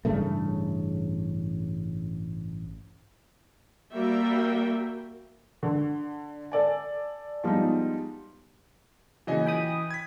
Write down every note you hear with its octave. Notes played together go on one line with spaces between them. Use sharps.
A1 G2 C#3 A3
G3 A#3 F#4 E5 G5
D3
A4 D5 G#5
F3 G3 G#3 B3 D#4
A#2 C#3 E3 F#3 D#5 G#5
G5 B5 D#6
G#6 B6